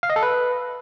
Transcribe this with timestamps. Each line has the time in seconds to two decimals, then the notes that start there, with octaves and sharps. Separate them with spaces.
0.03 F5
0.10 D#5
0.16 A4
0.23 B4